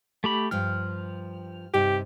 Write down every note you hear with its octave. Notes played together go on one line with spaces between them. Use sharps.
A3 G4 B5
G2 F3 G5 F6
G2 C3 D#4 G4